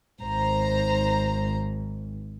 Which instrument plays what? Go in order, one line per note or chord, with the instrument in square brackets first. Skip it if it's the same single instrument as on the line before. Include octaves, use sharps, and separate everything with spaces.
[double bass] G#1 [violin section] C5 A#5